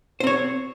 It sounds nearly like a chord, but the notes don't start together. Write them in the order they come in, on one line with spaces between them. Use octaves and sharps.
C5 C4 C#5